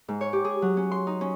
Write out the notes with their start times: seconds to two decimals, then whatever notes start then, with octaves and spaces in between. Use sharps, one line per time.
0.08 G#2
0.21 C#5
0.33 G4
0.44 G#4
0.62 F#3
0.77 C#4
0.92 C6
1.07 D#4
1.21 C#4